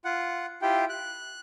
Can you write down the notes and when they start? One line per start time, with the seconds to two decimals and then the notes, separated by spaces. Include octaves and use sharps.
0.05 F4 F#5
0.62 E4 F4 G4 G5
0.89 F#6